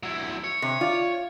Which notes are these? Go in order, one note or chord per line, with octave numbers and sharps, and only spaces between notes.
F#3 E4
C#5
C3
F4 D5